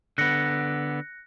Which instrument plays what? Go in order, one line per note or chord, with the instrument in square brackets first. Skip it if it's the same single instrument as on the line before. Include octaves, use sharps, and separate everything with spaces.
[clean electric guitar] D3 B3 [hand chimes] F#6 A#6 C#7